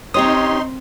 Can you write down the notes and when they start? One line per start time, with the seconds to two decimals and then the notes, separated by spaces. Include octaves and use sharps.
0.14 C4 C#4 D#4 G4 C#5 C6 D#6